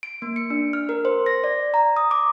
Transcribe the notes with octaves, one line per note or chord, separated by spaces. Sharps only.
D7
A#3
C#7
D4
F6
A#4
C5
A#6
D5
A#5
D#6
D6